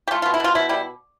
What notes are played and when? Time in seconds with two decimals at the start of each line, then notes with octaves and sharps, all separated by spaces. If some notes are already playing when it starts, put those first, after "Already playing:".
0.08 G4
0.11 A3 F4
0.22 B2 F4
0.34 E4
0.40 B2 F4
0.55 B2 E4
0.69 G3 E4